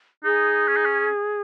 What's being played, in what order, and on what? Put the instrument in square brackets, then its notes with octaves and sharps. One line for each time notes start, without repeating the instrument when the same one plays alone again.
[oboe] D#4 [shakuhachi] G#4
[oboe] C#4
D#4
C#4